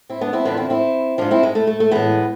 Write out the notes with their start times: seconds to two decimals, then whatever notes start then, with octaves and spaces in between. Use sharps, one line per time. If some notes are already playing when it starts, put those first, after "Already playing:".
0.10 C4 E4
0.21 B3 D4
0.33 C4 E4
0.45 E2 D3 F3 B3 D4
0.57 C4 E4
0.70 C4 E4
1.18 G#2 F3 D4 F4
1.31 C4 E4
1.43 G#3
1.55 A3
1.67 A3
1.80 A3
1.91 A2 E3 G#3 B3